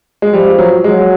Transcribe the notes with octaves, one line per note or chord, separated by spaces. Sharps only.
G#3
F3 G3
F#3
F#3 G#3